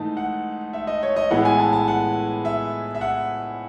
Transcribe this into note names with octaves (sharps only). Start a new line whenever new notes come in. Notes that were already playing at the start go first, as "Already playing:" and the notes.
Already playing: G#2 E3 A3 D#4 A5
F#5
E5
D#5
C#5
D#5
A2 E3 G#3 B3 E4 F#5
G#5
A5
A5
F#5
E5
E5
F#5